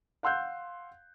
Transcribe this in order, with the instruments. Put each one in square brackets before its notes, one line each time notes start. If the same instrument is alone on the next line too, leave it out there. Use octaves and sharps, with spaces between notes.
[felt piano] F5 F#5 C6 E6 F#6 G6